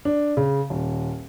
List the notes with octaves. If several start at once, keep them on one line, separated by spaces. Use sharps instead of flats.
D4
C#3
D#1